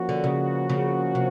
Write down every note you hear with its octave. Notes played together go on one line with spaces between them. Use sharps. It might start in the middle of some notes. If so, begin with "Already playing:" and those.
Already playing: F3 A#3 C#4 F#4
D3
C#3
C#3
C3